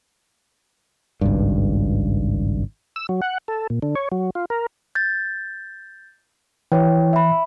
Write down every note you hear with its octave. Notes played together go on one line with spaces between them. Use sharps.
G#1 C#2 G2
E6
F#3
F#5
A4
A#2
D3
C#5
F#3
F4
A#4
G6 A6
E3 E4 C#5 G5
E5 B5